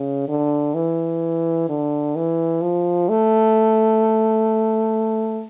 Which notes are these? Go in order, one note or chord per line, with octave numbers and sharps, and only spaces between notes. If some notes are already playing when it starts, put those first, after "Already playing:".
Already playing: C#3
D3
E3
D3
E3
F3
A3